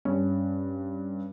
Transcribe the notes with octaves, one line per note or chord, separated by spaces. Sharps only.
G2 C#4